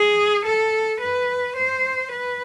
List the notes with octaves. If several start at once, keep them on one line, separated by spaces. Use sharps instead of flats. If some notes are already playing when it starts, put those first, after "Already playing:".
Already playing: G#4
A4
B4
C5
B4